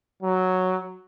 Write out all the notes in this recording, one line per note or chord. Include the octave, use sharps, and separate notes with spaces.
F#3